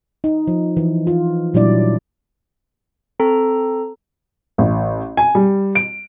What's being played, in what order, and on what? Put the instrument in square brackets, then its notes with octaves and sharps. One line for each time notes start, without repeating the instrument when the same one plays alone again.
[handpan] D#4
F3
E3
F4
A#2 F#3 G3 D4 E4 D5
[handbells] C4 A4 A#5
[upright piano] A1
G#5
G3
D7